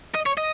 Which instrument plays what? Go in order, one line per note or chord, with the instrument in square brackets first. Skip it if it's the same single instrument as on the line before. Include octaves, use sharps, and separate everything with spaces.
[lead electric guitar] D#5
C#5
D#5